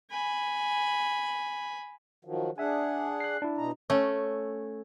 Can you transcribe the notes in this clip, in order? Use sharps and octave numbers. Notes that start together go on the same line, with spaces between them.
G#5 B5
D#3 F3 F#3
D4 G#4 E5 F#5 G#5
F#6 C7
D4 E4
B2 D#4 A#5
A3 C#4